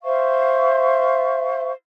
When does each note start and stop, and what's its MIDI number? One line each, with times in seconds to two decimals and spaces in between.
0.03 1.72 72
0.03 1.72 76
0.03 1.72 77
0.03 1.72 85